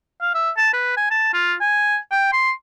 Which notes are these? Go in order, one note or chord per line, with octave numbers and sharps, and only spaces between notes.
F5
E5
A5
B4
G#5
A5
F4
G#5
G5
C6